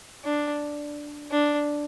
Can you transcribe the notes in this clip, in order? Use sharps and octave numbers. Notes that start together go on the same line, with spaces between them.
D4
D4